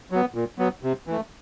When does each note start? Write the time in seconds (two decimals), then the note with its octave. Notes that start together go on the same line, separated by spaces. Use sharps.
0.11 F#3 B3
0.35 A#2
0.58 F#3 B3
0.83 C3
1.07 E3 A3